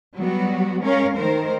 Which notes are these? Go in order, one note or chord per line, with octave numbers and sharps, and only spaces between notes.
F#3 G3 B3 F#4
G#3 C#4 A#4 C#5 F5
D#3 A3 A#4 C5